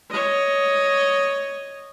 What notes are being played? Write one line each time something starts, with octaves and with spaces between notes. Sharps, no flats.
C#5 D#5